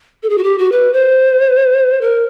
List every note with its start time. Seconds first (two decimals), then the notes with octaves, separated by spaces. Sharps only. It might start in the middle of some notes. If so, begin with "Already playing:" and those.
0.23 A4
0.30 G#4
0.38 F#4
0.44 G4
0.58 F#4
0.72 B4
0.93 C5
2.01 A#4